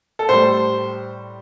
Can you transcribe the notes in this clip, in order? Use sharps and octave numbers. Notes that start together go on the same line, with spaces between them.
A4
A2 G3 C5